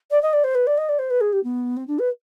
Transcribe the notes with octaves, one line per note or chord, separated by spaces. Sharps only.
D5
D#5
D5
C5
B4
D5
D#5
D5
C5
B4
G#4
G4
B3
C4
D4
B4